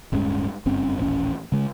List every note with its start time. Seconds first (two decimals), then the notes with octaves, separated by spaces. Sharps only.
0.12 D1 G2 G#3 C#4
0.66 F#1 G2 C4 C#4
0.98 D#1 A1 C#4
1.52 C#3 G#3